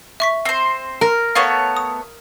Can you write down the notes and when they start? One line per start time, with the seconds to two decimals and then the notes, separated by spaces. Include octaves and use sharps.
0.20 E5 C#6 B6
0.45 C4 C5
1.01 A#4 F6
1.35 A3 B3 C#5 F5
1.77 D#6